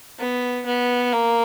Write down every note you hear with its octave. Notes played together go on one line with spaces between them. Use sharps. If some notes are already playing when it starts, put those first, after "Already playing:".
B3
B3
A#3